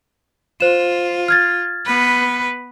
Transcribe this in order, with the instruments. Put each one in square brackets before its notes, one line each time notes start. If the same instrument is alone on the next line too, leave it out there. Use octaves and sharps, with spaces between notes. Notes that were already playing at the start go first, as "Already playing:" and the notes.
[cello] F4 [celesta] C5 E7
[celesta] F6 G#6 A6
[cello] B3 B4